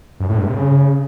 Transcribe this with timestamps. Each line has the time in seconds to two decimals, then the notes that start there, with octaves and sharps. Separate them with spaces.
0.20 F#2
0.29 A2
0.38 G2
0.47 C3
0.56 C#3